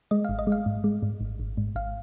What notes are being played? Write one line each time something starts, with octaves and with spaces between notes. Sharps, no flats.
G#3 D#5
G#1 F5
D#5
G#3
F5
G#2
G#3
G#2
G#1
G#1
G#2
G#1 F5